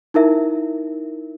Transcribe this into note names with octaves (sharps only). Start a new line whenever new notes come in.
D#4 E4 A#4 E5